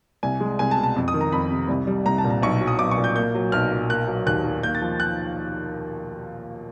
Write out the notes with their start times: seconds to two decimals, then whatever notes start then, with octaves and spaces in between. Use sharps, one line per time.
0.23 C2 G#5
0.40 G#3
0.59 C2 G#5
0.71 A5
0.77 B2
0.83 A5
0.96 F2
1.08 D#6
1.14 D#3
1.21 A#5
1.32 F2 B5
1.50 C3
1.69 C2
1.87 G3
2.06 C2 A#5
2.18 A5
2.24 A#2
2.31 A#5
2.43 B1 C#6
2.61 F#3
2.67 D#6
2.79 B1 D6
2.91 C#6
2.98 A#2
3.04 G6
3.15 A#3 G6
3.35 F#3
3.52 B1 F6
3.72 A#2
3.90 A#3 F#6
4.08 F#3
4.26 D#2 F#6
4.44 D#3
4.63 A#3 G6
4.75 A6
4.81 F3
5.00 F#6